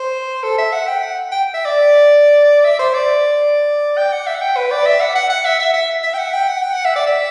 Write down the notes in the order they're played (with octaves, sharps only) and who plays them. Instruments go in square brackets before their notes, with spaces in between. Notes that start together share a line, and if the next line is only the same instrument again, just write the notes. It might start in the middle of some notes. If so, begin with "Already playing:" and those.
Already playing: [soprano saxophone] C5
A4
E5
F#5
G5
F#5
G5
E5
D5
E5
C5
D5
G5
F#5
E5
F#5
G5
B4
D5
E5
F#5
F#5
F#5
E5
E5
E5
E5
G5
F#5
G5
F#5
G5
F#5
E5
D5
E5